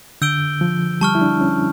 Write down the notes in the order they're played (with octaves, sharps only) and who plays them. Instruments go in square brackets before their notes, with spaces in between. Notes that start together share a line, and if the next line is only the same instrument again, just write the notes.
[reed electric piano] D3 [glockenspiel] E6 G6 D7 G7
[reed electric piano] F3
[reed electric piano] G3 [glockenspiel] A5 C#6 F6
[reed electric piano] E4
D4
C#4